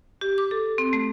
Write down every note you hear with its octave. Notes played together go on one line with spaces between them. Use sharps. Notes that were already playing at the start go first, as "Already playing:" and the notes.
G4
D6
A4
C4
A3